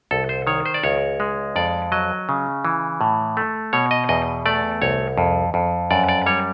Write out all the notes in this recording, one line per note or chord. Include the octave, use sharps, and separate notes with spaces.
C2 A4
C5
D#3 C#5
C5
D5
C#2 C#5
G#3
F2 D5
F#3 D#5
C#3
E3
A2
A3
B2 C#5
D#5
E2 D#5
A3 D5
C2 C#5
F2
F2
F#2 D5
D5
G3 C#5